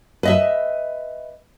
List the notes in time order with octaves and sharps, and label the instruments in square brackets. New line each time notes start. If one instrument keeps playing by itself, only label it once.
[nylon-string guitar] B4 D#5 E5